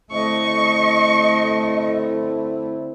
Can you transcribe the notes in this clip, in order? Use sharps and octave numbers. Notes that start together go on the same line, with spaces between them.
D3 A3 C4 E4 D#5 C#6